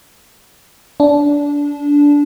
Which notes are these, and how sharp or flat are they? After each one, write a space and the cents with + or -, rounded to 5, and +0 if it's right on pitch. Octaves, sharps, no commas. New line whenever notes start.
D4 -20